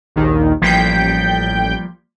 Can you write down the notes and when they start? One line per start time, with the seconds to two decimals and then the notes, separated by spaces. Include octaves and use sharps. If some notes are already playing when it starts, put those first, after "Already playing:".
0.16 A#1 D#2 D#3
0.62 A1 F3 G3 A#3 G5 G6